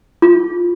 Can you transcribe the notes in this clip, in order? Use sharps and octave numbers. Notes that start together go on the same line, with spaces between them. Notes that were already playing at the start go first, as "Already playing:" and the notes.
F4